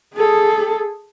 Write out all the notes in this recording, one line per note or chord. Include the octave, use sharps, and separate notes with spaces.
G#4 A4